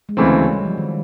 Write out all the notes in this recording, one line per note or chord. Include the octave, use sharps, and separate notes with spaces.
G#3
D2 C#3 E3 F#3 A3 C4
G3
F3
D#3